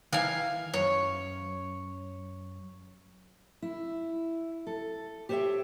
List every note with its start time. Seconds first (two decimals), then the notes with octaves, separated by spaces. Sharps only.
0.13 D#3 E3 F5 G#5
0.74 F#2 C#5
3.62 E4
4.67 A4
5.29 G4 C5 C#5 D#5 E5 G5